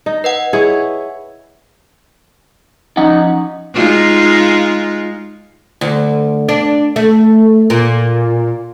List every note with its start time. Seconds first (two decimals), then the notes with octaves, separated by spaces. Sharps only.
0.06 D#4
0.24 B4 D#5 F#5
0.53 E4 G#4 C#5
2.97 F3 C#4 D#4 F#5
3.74 G#3 D#4 F4
5.81 D2
6.49 D4
6.96 A3
7.70 A#2